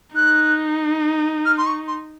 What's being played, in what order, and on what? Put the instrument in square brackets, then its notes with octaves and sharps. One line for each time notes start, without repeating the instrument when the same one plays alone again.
[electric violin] D#4 [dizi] F#6
[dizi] F6
C6
C#6
C6